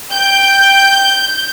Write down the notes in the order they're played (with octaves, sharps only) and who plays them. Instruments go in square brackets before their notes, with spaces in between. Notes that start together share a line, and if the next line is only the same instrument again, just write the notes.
[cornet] G5 [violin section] G6